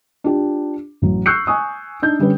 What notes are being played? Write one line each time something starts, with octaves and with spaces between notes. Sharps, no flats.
D4 F4 G4
A1 F#3
C#6 E6 F#6 G6 C7 C#7
G#5 C#6 D#6
D4 D#4 G6
D3 G3 C#4 B4